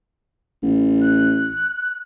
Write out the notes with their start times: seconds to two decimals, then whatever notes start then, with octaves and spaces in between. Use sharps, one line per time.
0.63 A1
1.01 F#6